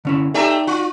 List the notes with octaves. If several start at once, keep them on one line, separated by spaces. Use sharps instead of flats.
D3 C#4 E4
A3 D#4 G4 D5 E5 A#5
F4